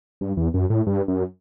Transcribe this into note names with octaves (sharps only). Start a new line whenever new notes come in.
G2
E2
F#2
A2
G2
F#2